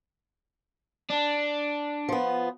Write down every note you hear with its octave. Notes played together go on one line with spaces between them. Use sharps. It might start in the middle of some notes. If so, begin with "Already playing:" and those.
D4
F3 B3